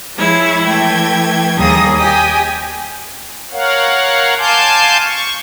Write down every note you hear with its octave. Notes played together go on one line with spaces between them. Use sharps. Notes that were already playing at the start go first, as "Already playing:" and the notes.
F3 G#3 E4 C#5 G#6
E3 A3 G5 G#6
D#2 G3 A#3 G#4 D#6 A#6
G4 D#5 G5 G#5 D#6
A#4 C#5 F5 F#5
F5 G#5 A5 C6 D6 G6
C#6